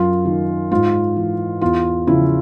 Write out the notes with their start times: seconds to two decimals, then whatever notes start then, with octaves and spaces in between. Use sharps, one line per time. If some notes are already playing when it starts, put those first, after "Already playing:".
Already playing: F#2 F4
0.25 D#3
0.71 G#2 F4
1.16 E3
1.61 E2 F4
2.07 C#3 F3 E4